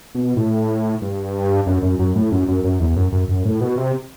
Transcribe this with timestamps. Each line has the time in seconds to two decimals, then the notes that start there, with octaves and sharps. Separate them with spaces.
0.15 B2
0.37 A2
1.02 G2
1.67 F#2
1.83 F#2
1.99 F#2
2.15 A2
2.32 F#2
2.48 F#2
2.64 F#2
2.80 E2
2.96 F#2
3.12 F#2
3.29 F#2
3.45 A2
3.61 B2
3.77 C3